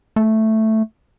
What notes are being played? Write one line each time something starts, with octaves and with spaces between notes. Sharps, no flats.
A3